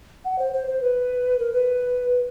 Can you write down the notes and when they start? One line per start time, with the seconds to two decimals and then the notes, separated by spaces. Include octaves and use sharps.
0.25 F#5
0.39 C5
0.53 C5
0.67 C5
0.82 B4
1.39 A#4
1.53 B4